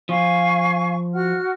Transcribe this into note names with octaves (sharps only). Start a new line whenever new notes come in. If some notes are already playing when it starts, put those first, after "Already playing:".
F3 F5 G#5 C#6
F#4 F#5 F6